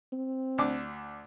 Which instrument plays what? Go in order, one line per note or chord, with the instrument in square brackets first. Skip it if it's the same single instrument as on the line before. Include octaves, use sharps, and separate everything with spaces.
[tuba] C4
[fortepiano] D2 D4 D6